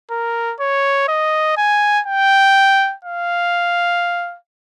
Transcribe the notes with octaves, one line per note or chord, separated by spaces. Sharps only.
A#4
C#5
D#5
G#5
G5
F5